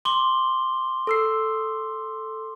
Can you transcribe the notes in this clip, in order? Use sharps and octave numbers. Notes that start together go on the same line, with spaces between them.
C6 D6 G7
A4 E6 C7